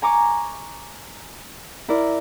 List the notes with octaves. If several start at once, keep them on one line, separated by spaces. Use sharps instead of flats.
G#5 A#5 C#6 D6
E4 A#4 D5